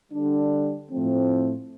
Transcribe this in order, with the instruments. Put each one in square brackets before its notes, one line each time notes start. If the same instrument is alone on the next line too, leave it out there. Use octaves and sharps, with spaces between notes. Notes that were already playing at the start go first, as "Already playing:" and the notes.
[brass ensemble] D3 G3 D4
A2 F3 A3 C4